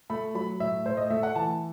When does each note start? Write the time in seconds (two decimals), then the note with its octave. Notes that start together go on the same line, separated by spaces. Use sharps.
0.10 A3 B5
0.35 F#3 B5
0.60 A2 E5
0.86 A2 C5
0.97 D#5
1.10 A3 E5
1.23 F#5
1.35 E3 A5